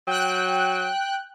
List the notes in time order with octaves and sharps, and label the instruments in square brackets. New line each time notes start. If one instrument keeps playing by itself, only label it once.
[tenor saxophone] F#3 [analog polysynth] G5 F#6